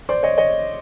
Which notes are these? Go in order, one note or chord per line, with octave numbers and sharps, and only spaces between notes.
C5 D5
C#5 D#5
C#5 D#5